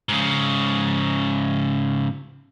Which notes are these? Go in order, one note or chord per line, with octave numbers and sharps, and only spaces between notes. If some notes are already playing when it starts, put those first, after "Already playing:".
G#2 C#3